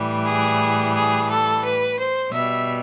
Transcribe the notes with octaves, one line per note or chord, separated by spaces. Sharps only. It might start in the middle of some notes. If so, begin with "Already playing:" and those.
Already playing: A2 E3 G3
G#4
G#4
A4
B4
C5
B2 G3 E5